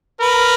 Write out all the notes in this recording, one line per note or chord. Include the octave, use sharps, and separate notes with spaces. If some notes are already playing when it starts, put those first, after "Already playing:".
A#4 B4